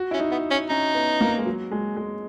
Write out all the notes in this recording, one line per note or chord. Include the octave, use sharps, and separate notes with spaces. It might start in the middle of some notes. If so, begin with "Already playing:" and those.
Already playing: F#4
C#4 E4
D#4
B3
C#4
C#4 D#4
B3
A#3
G#3
F#3
G#3
G#3